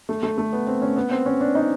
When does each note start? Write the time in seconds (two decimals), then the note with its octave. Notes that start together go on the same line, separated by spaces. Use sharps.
0.09 A3
0.23 A3
0.38 A3
0.53 B3
0.67 C4
0.82 C#4
0.96 B3
1.11 C4
1.26 C#4
1.41 D4
1.55 D#4